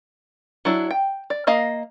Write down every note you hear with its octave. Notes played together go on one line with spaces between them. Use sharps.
F#3 D4 E4
G5
D5
A#3 D#5 F5